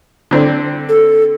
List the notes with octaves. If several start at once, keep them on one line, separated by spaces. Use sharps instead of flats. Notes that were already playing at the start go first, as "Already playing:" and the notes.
D3 C4 D4
A4